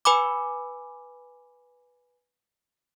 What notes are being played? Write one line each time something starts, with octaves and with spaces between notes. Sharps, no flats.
B4 G#5 B5 D6